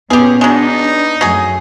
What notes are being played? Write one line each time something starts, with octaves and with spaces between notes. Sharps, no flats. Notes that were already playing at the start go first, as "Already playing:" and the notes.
A#2 B3 C#4 G4 G#4
F#3 G#3 D4 D#4
F#2 F#3 A3 G#4